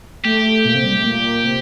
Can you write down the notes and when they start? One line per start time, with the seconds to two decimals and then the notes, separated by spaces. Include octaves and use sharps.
0.25 A3 G4
0.65 A#2 A#3
0.74 C3 C4
0.83 G3
0.94 A3
1.04 A#2 A#3
1.42 C3 C4